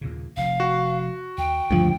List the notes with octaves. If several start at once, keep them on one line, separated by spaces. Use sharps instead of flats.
D#2 A#2 C#3
F1 F2 F5
F#4
D#2 G5
A1 D2 G2 C#3 F3 G#3